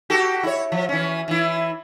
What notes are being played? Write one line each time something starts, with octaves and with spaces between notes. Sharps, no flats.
F#4 G4 A4
E4 C#5
F3
E3 C#4
E3 E4